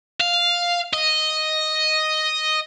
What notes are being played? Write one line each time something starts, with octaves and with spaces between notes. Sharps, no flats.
F5
D#5